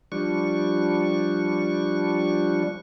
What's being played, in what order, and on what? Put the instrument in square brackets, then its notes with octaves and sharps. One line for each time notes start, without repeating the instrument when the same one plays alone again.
[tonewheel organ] F3 G3 D4 C#6